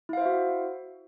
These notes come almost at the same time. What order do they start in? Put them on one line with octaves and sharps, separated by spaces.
E4 F5 C5 E5 F#4